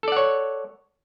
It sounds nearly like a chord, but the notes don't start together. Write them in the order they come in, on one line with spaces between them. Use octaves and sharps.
A4 D5 F#5 C#5